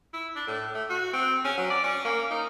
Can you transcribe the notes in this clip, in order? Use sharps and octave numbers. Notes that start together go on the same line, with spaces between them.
E4
D4
A2
A3
F#4
C4
C#4
F#3
D5
C#4
A#3
D#4